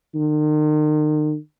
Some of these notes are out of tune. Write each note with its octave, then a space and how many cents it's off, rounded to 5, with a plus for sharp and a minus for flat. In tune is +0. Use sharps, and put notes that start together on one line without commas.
D#3 -40